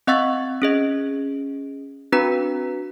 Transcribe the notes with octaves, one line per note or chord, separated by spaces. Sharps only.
C4 D#5 F#5 C#6 E6 A6
C#4 G#4 D#5
C4 D4 F#4 B4 A#5 B6